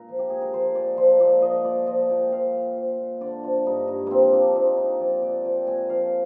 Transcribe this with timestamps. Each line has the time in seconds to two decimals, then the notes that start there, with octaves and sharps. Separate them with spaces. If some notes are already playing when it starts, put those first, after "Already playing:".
Already playing: A#2 A#4
0.08 F3
0.19 G4
0.30 A#2 G#4
0.42 A#4
0.54 F3 C5
0.75 A#2 D5
0.97 F3 C5
1.20 A#2 D5
1.42 F3 D#5
1.65 A#2 D5
1.87 F3 D#5
2.10 A#2 G5
2.31 F3 F5
2.54 A#2
2.77 F3
2.99 A#2
3.21 D3 D5
3.44 F3
3.66 G2 D#4
3.88 G2
4.07 F3 A#3 C4
4.33 A#2 D4
4.55 F3 D#4
4.77 A#2 D#4
5.00 F3 D5
5.22 A#2 D5
5.45 F3 G5
5.67 A#2 G#5
5.90 F3 F5